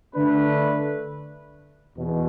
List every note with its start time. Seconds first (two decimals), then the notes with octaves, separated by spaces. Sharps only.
0.15 D3 A3 D4 B4
1.96 E2 B2